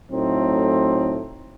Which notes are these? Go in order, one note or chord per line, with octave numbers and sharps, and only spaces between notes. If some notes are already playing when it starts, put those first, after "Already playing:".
A2 F#3 A3 C4 D#4